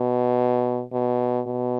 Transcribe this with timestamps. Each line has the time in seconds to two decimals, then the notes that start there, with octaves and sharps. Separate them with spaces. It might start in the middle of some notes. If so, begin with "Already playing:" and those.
Already playing: B2
0.93 B2
1.47 B2